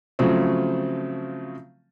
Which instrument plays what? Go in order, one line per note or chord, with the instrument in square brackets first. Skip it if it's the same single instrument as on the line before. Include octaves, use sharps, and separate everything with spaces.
[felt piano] C#3 F3 F#3 A3 C4